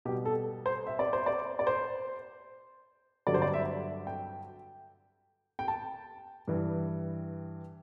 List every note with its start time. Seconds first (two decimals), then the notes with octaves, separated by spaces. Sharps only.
0.05 B2 G4
0.09 G3
0.25 A4
0.66 C5
0.87 E5
0.99 D5
1.13 C5
1.26 D5
1.59 D5
1.67 C5
3.27 G2 D3 F#3 D5
3.34 C5
3.42 D5
3.54 E5
4.07 G5
5.59 G5
5.68 A5
6.48 G2 E3 G3